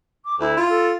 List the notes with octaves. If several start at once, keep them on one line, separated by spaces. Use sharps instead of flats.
D6
D2 E4
F4
A4